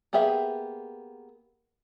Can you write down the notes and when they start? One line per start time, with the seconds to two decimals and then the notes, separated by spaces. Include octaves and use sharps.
0.13 A#3 B3 G4 G#4 E5